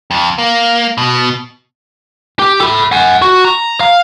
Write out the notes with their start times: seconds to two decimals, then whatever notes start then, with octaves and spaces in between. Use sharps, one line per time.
0.11 F2
0.38 A#3
0.98 B2
2.39 G4
2.61 A4 B5
2.92 F#5 G#5
3.22 F#4
3.45 A#5
3.80 F5